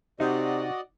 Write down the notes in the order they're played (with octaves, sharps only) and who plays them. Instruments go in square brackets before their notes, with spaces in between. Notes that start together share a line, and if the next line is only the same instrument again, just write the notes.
[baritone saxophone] C3 [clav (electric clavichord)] D#4 [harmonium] F#4 D5 D#5